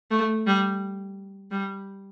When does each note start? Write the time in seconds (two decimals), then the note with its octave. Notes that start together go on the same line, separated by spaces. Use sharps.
0.11 A3
0.47 G3
1.51 G3